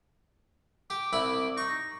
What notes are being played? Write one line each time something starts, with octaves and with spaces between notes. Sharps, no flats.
G4 D6
C2 E4 B5
D#4 C#6